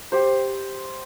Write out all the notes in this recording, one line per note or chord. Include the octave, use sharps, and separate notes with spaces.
G4 C5